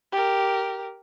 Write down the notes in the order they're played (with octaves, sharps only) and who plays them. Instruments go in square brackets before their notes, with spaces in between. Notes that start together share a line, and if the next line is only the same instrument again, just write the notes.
[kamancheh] G4 A#4